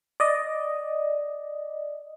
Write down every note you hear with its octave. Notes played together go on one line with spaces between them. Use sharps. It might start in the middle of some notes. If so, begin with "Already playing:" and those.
D5 D#5